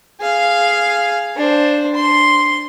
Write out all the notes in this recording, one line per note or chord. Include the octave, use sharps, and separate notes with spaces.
G#4 F5
D4 C5
C6